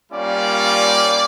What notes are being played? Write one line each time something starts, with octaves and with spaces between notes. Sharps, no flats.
G3 A#3 C#4 F4 D5